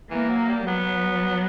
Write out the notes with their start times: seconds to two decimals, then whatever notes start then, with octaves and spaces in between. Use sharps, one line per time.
0.11 E3 A#3
0.30 F#3
0.48 G3
0.67 F#3 B3